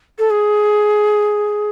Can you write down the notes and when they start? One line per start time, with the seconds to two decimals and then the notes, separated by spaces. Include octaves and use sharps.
0.19 A4
0.30 G#4